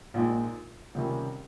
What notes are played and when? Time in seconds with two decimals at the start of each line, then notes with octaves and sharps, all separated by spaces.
0.14 A#1 A#2 G#3 D#4
0.95 C#2 C3 D#3 G3 C#4